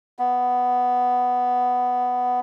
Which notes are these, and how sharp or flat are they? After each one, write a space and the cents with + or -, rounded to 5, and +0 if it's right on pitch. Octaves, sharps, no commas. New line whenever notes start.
B3 +5